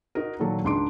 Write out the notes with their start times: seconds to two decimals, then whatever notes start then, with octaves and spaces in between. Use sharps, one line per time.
0.15 D#4 F#4 A#4
0.39 A#2 D#3 F#3 A4
0.64 C#2 G#2 D4 C6 D6 D7